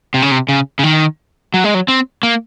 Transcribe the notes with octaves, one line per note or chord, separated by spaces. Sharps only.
C3
C#3
C3
C#3
C#3
D#3
F#3
G#3
F#3
C4
A#3